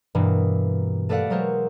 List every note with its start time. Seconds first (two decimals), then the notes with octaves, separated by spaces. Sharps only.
0.15 G2 B2 E3 A#3
1.09 A3 A4 B4 D5 F5 F#5
1.30 F#3 G#3 A#4 C5 C#5